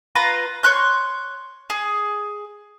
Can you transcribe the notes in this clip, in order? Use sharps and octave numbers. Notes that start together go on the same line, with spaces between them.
F4 B4 A#5
C#5 C6 F#6 G6
G#4